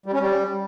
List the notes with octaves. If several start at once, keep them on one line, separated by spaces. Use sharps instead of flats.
G3
C#4
G3